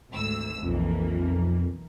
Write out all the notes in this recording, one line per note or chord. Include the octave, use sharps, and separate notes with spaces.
G#1 D2 E6
B1 F2 E3 A#3